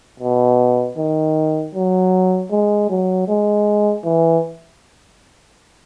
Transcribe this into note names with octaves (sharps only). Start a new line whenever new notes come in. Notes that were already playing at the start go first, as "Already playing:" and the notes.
B2
D#3
F#3
G#3
F#3
G#3
E3